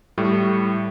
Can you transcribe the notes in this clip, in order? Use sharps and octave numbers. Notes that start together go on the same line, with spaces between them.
A2 G3 A3